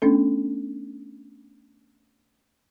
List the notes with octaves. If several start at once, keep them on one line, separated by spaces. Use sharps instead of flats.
A3 B3 C#4 D4 A4